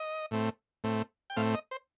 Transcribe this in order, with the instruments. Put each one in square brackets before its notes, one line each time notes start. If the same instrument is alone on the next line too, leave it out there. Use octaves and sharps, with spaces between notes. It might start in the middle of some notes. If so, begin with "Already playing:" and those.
Already playing: [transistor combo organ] D#5
A2 A3 C4
A2 A3 C4
G5
A2 A3 C4 F5
D#5
C5